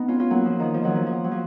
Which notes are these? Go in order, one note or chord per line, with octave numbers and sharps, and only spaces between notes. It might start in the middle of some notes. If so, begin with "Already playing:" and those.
Already playing: B3 D#4
C#4 F4
C#4 F4
F#3 A#3
F3
D#3
F3
D#3 F#3
F3
F3
F#3
F3